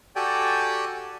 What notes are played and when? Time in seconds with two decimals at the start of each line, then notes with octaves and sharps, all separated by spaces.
0.16 F#4 G4 A4 D5 G5 G#5